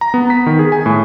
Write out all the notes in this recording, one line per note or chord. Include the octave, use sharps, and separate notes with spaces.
A#5
B3
B6
D#3
G#4
G#5
A2